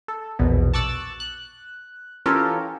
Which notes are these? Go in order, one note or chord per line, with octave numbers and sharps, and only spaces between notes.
A4
A#1 E2 B2
A5 C#6 D6 E6 F#6 A6
F#6
E3 C#4 F4 G4 A4 A#4